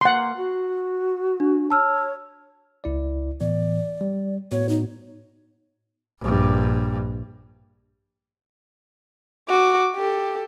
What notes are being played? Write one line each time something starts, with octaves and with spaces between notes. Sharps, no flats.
A#3 F#5 C6
F#4
D4
C#5 A5 E6 F6
C#2 E4 D5
A2 E3 B3 D5
G3
A2 B3 F#4 C#5
D#4
A#1 G2
F#4 D6
G4 A4